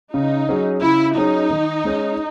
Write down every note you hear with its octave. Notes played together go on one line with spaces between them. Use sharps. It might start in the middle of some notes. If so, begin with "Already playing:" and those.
C#3 D#4
F#3 C#4 G#4
C#3 E4
F#3 C#4 D#4 G#4
D#3
G#3 C#4 G#4